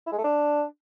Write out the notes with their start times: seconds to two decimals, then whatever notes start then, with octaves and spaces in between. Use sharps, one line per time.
0.06 E4
0.12 G#3
0.18 A3
0.24 D4